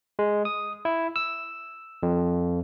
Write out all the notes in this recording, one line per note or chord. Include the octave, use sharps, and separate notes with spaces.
G#3
D#6
E4
E6
F2